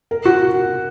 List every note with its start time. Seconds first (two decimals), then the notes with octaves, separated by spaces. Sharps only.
0.11 A#4
0.25 F#4